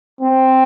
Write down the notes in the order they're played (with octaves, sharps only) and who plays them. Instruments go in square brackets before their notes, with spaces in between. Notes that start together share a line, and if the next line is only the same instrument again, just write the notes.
[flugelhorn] C4